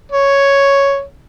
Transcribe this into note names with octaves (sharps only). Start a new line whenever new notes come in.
C#5